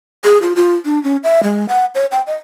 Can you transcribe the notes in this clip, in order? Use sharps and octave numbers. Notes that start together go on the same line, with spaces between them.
G#4
F4
F4
D4
C#4
E5
G#3
F#5
C#5
G5
D#5